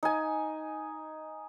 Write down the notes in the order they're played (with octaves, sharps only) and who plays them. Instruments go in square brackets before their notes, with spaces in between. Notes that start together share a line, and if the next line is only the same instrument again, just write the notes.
[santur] D#4 G#5